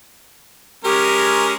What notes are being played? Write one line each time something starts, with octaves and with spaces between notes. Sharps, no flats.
G#3 C#4 G4 A#4